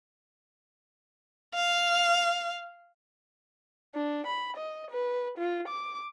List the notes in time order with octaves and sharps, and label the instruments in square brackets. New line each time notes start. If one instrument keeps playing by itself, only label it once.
[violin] F5
[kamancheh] D4
B5
D#5
B4
F4
D6